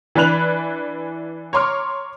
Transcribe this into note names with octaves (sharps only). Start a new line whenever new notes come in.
E3 D4 B4 F#6 F7 F#7
C#5 A#5 C6 D6 F6